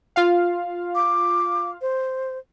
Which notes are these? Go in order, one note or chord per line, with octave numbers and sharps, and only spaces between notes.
F4 F5
D6
C5